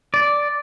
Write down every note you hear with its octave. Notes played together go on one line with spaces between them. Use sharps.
D5